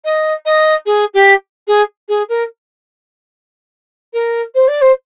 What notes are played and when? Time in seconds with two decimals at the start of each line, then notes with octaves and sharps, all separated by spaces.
0.05 D#5
0.46 D#5
0.86 G#4
1.14 G4
1.68 G#4
2.09 G#4
2.29 A#4
4.13 A#4
4.55 C5
4.68 D5
4.82 C5